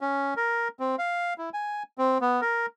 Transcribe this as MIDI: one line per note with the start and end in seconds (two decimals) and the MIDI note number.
0.01 0.34 61
0.37 0.68 70
0.80 0.96 60
0.99 1.34 77
1.38 1.50 64
1.54 1.83 80
1.98 2.18 60
2.21 2.41 59
2.41 2.66 70